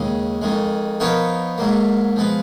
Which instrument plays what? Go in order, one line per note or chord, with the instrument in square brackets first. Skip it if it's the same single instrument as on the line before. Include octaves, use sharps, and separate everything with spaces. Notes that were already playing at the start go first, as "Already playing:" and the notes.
Already playing: [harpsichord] D#2 C#3 G#3
F2 D#3 G#3
F3 B3 D#4 A#4 C#5
G#2 F#3 A#3
F3 G#3 B3